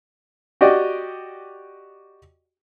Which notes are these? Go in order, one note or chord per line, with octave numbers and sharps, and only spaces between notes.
F#4 G4 D5 D#5